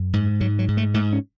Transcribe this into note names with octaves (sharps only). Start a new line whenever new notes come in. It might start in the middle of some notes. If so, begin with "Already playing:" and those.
Already playing: F#2
G#2
G#2 F#3
F#3
G#2
A3
G#2 A3
C#4